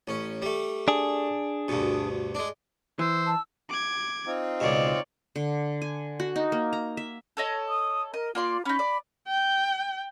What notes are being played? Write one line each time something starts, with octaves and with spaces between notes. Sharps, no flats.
A1 C#4
G3 A3
D4 G#4
D2 G2 B2
G#3 D4
E3 C5 E6
A5
D6 G#6
C4 D#4 F4
C#2 B2 C#5 D5
D3
G#5
F#4
D#4
A#3
A#5
E5
A4 C#5 D#5
D#6
A#4 D#5
A#3 F4 D5 C6
C#4 D#4 B5
D5
G5